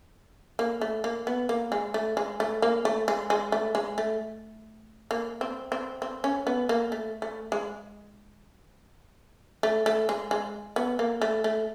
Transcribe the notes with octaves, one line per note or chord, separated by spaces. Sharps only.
A#3
A3
A#3
B3
A#3
G#3
A3
G#3
A3
A#3
A3
G#3
G#3
A3
G#3
A3
A#3
C4
C4
C4
C#4
B3
A#3
A3
A3
G#3
A3
A3
G#3
G#3
B3
A#3
A3
A3